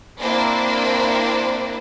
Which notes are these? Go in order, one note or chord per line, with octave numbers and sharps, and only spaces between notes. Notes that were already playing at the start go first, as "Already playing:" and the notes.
A#3 C4 D4 E4 C5